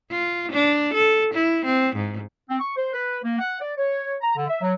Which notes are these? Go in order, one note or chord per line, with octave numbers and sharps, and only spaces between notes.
F4
D4
A4
E4
C4
G#2
C4
C#6
C5
B4
A#3
F#5
D5
C#5
A#5
D3
E5
F#3